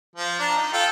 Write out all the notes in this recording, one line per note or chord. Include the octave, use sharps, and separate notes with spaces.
F3
D4 A#5
D#4
F4 A4 G5